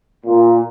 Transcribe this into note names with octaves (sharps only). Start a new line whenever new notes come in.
A#2